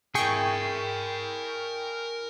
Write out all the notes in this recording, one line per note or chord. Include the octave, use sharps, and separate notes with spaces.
E4 G#4 A#4 G5 G#5 C#6